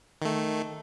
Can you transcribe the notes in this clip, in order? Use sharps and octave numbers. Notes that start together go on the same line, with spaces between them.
D#3 A3